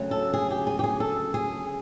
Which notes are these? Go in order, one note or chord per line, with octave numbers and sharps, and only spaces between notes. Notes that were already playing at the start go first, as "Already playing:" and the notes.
Already playing: D2 C#3 F#3 A3
A4
G#4
G4
G#4
G4
G#4
A4
G#4